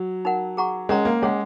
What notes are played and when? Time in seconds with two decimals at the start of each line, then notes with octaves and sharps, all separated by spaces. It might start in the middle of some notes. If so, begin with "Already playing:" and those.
Already playing: F#3
0.25 D#4 A#4 F#5
0.57 G#4 F#5 A#5 C#6
0.89 G#3 C#4 A#4 C#5 F#5 A#5
1.05 A#3
1.22 G#3 C#4 G#4 C#5 F#5